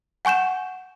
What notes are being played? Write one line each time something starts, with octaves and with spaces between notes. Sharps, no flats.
F#5 G#5 C#6 G6 E7